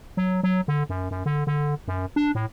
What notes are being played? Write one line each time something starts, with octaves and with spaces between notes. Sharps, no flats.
F#3
F#3
D3
F#2
F#2
D3
D3
F#2
D4
A2